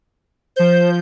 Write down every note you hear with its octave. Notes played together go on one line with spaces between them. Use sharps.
F3 C5 G6